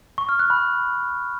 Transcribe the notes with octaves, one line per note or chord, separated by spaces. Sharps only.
C#6
F6
F#6
B5